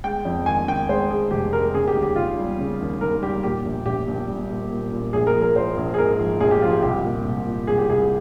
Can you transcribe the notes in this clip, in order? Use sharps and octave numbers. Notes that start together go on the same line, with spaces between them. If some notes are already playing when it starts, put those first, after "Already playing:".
G#3 G5
F2
D#3 G#5
D#3 G5
G#3 C5
G#3 G#4
F1 G4
G#3 A#4
C#3 G#4
G4
D#2
G4
C#3 F4
G3
C#3
D#2
D#2 A#4
G3 G4
A#2 G4
A#1
A#1 G4
A#1
G3
A#2
A#2
A#2
A#1 G#4
A#4
F3
A#4
F3 C5
A#1
G#4
G#2 A#4
F3
A#1 G#4
G4
F3 F4
G4
C2 G4
A#2
C2
A#2
C2 G#4
G4
C2 G#4